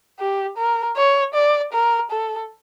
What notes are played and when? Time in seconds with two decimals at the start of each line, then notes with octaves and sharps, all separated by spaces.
0.19 G4
0.58 A#4
0.96 C#5
1.34 D5
1.73 A#4
2.11 A4